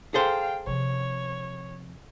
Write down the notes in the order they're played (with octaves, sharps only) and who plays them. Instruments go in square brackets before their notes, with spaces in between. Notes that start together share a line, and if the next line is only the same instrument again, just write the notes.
[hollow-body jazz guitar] G#4 A4 C5 [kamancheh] F5 G5
[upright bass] C3 F3 [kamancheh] C#5